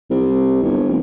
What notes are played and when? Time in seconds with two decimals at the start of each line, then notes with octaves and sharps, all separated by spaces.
0.10 C2
0.63 G1
0.88 F1